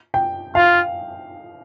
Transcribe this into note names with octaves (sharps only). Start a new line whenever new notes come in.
G5
F4 F5